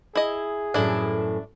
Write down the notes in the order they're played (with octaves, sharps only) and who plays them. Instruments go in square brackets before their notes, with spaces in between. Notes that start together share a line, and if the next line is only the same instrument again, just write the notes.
[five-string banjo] E4 D#5 [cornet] G#4
[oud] F#2 A2 E3 [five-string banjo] D4 E4